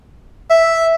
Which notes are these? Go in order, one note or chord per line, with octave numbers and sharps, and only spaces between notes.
E5